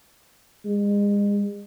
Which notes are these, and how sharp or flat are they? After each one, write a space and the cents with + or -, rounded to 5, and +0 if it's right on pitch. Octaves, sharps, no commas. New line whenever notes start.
G#3 -35